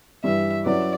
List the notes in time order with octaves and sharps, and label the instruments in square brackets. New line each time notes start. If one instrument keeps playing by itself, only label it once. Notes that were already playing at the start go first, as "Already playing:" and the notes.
[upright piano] G2 E3 G3 [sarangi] E5
[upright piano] F#3 C#4 E4 B4 [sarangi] D5